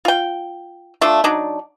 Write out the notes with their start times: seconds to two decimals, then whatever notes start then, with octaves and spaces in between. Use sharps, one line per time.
0.05 F4 G5
1.01 A3 D4 F4
1.24 F#3 D4 D#4